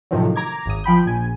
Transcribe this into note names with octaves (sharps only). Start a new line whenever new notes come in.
A2 C3 D#3 F3 F#3
A#5 D6 G#6
G#1 D#6
F3 G5 B5 G6
A#1 G#5